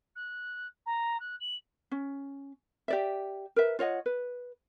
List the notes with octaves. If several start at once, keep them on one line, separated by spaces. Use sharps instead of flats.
F#6
A#5
F#6
F#7
C#4
G4 D5 E5
A#4 B4 E5
F4 C#5 D#5 F#5
B4